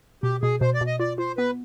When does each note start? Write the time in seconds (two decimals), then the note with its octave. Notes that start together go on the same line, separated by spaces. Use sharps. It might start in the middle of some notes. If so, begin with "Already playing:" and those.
0.23 B2 G4
0.42 B2 G#4
0.61 B2 C5
0.74 D5
0.81 B2
0.87 D#5
1.00 F4 D5
1.18 F4 C5
1.37 B3 B4